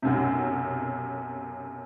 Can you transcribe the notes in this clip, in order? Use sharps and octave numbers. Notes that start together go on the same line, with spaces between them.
B1 F#2 C3